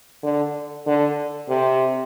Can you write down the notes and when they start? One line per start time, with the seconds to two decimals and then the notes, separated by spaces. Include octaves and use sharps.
0.23 D3
0.86 D3
1.49 C3